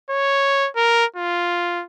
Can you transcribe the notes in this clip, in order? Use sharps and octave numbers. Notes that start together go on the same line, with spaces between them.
C#5
A#4
F4